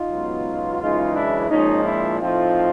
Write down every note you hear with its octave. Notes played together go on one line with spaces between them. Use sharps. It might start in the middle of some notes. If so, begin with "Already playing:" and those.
Already playing: D#4 F4
C#2 B2 F#3 B3
F#2 C#3 E3 G#3 D#4 F4
D4 E4
A#2 F3 G#3 C#4 D#4
D4 E4
A2 F3 A3 C4 D#4 F4